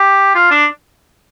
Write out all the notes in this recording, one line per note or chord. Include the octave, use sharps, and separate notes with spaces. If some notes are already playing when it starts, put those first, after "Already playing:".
Already playing: G4
F4
D4